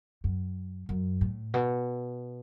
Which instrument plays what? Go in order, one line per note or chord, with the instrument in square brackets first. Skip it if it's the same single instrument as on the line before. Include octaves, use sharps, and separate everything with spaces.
[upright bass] F#2
F#2
A2
B2